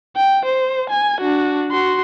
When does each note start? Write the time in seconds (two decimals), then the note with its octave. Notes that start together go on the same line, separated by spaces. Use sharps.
0.16 G5
0.46 C5
0.90 G#5
1.21 D4 F#4
1.71 F#4 C6